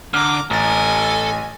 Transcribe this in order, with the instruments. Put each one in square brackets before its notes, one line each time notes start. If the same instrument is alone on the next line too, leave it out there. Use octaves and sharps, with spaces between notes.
[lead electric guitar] D3 [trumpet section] A#5 D6 [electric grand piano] F6
[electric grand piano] A1 A6 [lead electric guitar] A4 A#5 [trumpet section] D#5 G#5